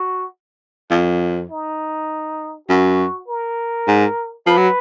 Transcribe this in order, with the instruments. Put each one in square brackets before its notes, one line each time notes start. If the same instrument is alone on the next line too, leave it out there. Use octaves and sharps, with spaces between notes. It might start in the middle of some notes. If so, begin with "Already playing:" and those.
Already playing: [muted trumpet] F#4
[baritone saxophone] F2
[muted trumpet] D#4
[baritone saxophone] F#2 [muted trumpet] F#4
[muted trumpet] A#4
[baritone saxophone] G#2
[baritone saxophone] F3 [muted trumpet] B4
[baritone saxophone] F#3